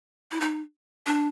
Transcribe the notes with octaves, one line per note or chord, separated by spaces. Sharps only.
E4
D#4
D4